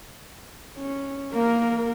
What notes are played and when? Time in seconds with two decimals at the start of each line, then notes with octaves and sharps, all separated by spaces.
0.78 C#4
1.34 A#3 A#4